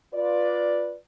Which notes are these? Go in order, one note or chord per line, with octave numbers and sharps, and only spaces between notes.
F4 B4 D5